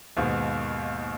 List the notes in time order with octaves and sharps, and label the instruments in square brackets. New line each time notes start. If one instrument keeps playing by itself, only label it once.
[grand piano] D#2 G#2 B2